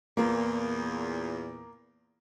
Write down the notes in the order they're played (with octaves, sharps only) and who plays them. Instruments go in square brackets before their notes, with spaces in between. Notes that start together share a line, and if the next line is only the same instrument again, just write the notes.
[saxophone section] E2 A#2 [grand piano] A#3